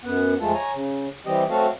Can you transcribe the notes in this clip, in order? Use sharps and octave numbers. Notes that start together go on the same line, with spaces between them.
F#2 B3 F#5
F2 G#3 A3 F4 A4
C#5 G#5 A#5
C#3
E3 G3 C4 G4 D#5
F#3 A3 C4 F#4 A4 F5